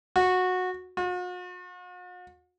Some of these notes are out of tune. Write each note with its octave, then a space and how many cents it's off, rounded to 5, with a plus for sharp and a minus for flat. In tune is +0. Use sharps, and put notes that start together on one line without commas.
F#4 -15
F#4 -45